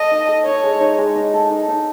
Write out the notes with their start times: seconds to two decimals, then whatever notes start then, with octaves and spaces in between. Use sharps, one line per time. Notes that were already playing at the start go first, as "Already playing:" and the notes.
Already playing: A4 D#5
0.11 D#4
0.28 A4
0.45 D#4 C#5
0.64 G#3
0.81 D#4
0.98 G#3
1.16 D#4
1.34 A4
1.51 D#4
1.68 D#4